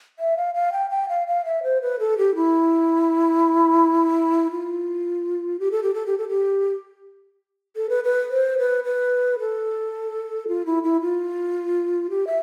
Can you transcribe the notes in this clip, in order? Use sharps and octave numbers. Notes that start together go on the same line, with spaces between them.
E5
F5
F5
G5
G5
F5
F5
E5
C5
B4
A4
G4
E4
F4
G4
A4
G4
A4
G4
A4
G4
A4
B4
B4
C5
B4
B4
A4
F4
E4
E4
F4
G4
E5